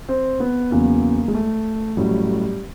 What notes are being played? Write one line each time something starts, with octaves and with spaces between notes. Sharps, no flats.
C4
B3
E2 C#3 F#3 A#3
G#3
A3
A1 A2 F#3 G3